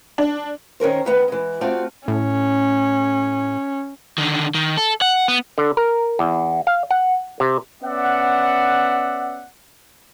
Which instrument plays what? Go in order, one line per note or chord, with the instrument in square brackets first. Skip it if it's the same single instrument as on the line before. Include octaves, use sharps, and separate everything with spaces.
[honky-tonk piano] D4
[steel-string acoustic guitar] D#3 C#4 A#4 C5
D2 D#3 B3
E3 G#3
A3 C4 F4 F#4 D5
[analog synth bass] A2 [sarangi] C#4
[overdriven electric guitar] D3 D#3
D#3
A4
F#5
B3
[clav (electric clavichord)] D3
A#4
E2
F5
F#5
C3
[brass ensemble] B3 C#4 D5 E5 F#5